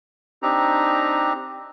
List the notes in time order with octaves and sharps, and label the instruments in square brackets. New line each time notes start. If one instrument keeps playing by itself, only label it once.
[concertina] C4 D4 D#4 G4 A#5